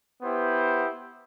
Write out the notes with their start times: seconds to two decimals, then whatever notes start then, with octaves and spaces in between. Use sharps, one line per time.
0.22 B3 E4 G4 C5